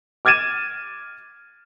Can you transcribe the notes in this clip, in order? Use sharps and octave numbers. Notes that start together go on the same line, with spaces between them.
D6 F6 G#6 A6 D#7 E7